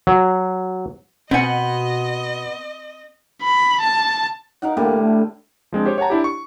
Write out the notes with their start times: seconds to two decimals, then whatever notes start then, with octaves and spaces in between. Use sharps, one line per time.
0.07 F#3
1.31 B2 B3 C4 D#5 F#5 G#5
3.43 B5
3.81 A5
4.62 D#4 A#4 F5 F#5
4.77 A2 D3 G3 A#3
5.01 A3
5.72 F3 G#3 C4 D4
5.86 G4 C5 C#5
5.98 C#5 F#5 G5 A5 A#5
6.10 D4 E4 G4
6.24 C#6